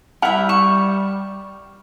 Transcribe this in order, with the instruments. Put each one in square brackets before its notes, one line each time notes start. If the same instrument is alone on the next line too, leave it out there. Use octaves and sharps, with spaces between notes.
[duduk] G3 [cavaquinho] E4 E5 [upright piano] F#5 F6 F7
[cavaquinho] C#6 [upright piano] E7